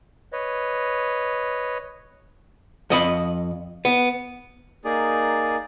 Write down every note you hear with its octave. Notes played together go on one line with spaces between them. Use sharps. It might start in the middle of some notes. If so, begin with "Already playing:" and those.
B4 C#5 D#5
F2 D#5 B5
B3
A#3 D#4 G#4 D5